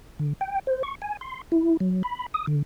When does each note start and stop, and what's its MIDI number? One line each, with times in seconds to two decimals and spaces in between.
0.19 0.33 50
0.41 0.59 79
0.67 0.83 72
0.83 0.95 85
1.02 1.17 80
1.21 1.41 84
1.52 1.77 64
1.80 2.02 54
2.03 2.26 83
2.34 2.46 87
2.47 2.62 50